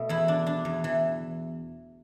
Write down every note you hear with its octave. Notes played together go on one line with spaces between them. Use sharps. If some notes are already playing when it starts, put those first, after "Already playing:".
Already playing: B2 A3
E2 E4
D4
D4
E2
E3